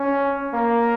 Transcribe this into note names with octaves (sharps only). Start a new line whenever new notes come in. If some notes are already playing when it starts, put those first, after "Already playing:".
Already playing: C#4
A#3